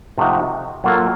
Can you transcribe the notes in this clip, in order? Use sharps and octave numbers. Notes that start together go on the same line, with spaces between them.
C3 F3 A3 D#4 F#4
F#3 A#3 F4 A4